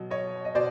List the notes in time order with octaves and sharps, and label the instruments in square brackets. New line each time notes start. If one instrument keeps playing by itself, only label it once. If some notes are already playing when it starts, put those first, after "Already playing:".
Already playing: [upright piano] B2 F#3
C#5 D#5
D#5
B2 C5 D5